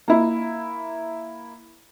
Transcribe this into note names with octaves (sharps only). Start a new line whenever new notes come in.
A#3 E4